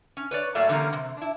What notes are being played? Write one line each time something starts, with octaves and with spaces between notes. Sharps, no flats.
C#4
B4 C#5 D5
A2 F#3 A3 A#3 D5 E5
D3 E3 G3 A#3 C#4 A#4
C3
D4 E4